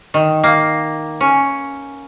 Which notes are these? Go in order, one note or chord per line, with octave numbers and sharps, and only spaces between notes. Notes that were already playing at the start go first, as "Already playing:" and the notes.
D#3
A#3
C#4